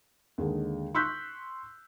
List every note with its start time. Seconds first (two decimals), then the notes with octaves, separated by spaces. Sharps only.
0.38 D#2 D3 G#3
0.95 C6 C#6 E6 F#6 G6 B6